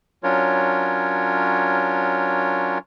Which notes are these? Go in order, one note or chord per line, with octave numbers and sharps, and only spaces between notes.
F#3 C#4 D4 F4 A#4 C#5